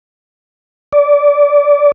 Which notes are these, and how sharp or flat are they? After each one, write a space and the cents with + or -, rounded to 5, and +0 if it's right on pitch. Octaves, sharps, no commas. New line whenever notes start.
D5 -20